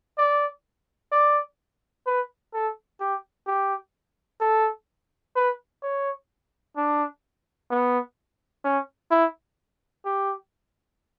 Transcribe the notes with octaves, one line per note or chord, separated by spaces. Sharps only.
D5
D5
B4
A4
G4
G4
A4
B4
C#5
D4
B3
C#4
E4
G4